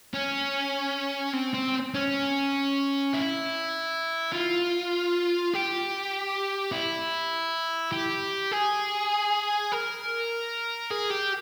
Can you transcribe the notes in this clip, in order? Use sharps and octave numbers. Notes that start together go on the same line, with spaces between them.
C#4
C4
C4
C#4
E4
F4
G4
E4
G4
G#4
A#4
G#4
G4